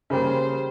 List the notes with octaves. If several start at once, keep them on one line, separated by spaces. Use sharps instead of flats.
C#3 G3 A#3 C5